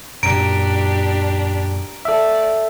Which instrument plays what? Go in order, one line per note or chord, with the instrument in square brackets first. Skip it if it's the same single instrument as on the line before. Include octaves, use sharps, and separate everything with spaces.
[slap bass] F#2 A#2 [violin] D4 G4 [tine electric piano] A#5 [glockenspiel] D7
[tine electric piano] A4 E5 [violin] D5